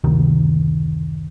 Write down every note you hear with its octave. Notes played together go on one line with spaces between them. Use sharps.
F#1 D2 C3 D#3